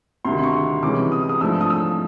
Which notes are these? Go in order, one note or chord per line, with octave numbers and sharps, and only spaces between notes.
D2 C3 D#3 C6
C#6
C2 C3 E3 G#3 C#4 D6
D#6
D#6
G#2 F3 A3 D4 E6
D#6
E6